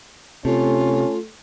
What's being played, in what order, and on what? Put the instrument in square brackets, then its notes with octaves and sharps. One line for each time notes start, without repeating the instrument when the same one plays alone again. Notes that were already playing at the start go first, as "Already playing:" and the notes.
[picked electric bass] C3 [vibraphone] A3 A4 [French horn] C#4 [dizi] F4